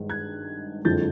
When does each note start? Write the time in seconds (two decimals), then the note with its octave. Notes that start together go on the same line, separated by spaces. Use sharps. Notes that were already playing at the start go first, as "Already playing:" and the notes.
Already playing: G#1 G2 D#3 G#3
0.09 F#6 G#6
0.85 F#1 F2 D3 F3 G#3 G6 A6